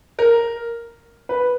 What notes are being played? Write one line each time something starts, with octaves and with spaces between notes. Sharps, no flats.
A#4
B4